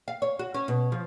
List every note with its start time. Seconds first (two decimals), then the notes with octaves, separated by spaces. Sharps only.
0.08 F5
0.22 C#5
0.39 F#4
0.54 C#4
0.68 B2
0.92 F3